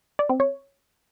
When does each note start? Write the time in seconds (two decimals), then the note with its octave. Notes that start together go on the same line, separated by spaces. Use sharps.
0.19 D5
0.29 C4
0.40 C#5